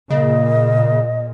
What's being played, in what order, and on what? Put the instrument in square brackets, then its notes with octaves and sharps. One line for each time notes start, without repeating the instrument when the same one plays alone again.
[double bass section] A#2 [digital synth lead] C#3 [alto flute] D#5